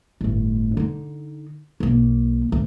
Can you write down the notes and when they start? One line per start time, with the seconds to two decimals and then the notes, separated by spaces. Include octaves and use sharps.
0.21 G1 A2
0.77 D3 D#4
1.80 B1 A#3
2.49 D2 G#2